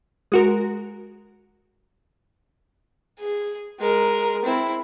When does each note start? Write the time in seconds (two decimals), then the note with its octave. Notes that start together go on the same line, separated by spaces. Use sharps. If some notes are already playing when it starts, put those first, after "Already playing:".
0.32 G#3 F#4 A#4
3.19 G#4
3.80 G#3 A#4
4.45 C4 E4